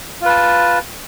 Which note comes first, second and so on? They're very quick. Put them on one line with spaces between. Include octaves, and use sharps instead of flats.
F4 B4 A5